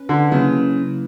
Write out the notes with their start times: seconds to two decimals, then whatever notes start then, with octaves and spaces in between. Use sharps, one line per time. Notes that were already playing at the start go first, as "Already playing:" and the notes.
Already playing: C#4 B4
0.09 D3
0.31 C#3 F#3 A#3 E4 B4